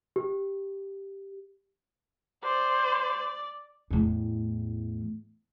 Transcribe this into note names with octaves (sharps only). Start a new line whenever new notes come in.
G4
C5 D5
E2 A2